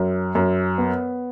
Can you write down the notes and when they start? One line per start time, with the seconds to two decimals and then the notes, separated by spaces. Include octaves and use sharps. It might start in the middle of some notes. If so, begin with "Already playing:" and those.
Already playing: F#2
0.35 F#2
0.78 B3